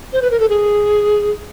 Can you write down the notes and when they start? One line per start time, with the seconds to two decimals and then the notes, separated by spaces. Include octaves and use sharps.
0.13 C5
0.22 B4
0.31 A#4
0.40 A4
0.49 G#4